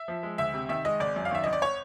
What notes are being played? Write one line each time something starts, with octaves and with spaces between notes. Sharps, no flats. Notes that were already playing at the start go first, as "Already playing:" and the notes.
Already playing: E5
F3
G#3
D2 E5
C3
D#3 E5
G#3 D#5
G#1 D5
F#2
F5
D#3 E5
G#1 D#5
D5
C#5